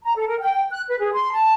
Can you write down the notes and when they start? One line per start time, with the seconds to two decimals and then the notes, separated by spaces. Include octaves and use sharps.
0.03 A#5
0.16 A4
0.28 A#4
0.40 G5
0.70 F#6
0.88 B4
1.00 G#4
1.13 C6
1.32 A5